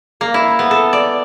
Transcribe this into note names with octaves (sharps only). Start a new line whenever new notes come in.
A#3
E4
B3
A4
D5